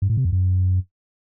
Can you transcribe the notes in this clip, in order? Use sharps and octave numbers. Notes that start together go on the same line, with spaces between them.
G2
A2
C3
F2
F#2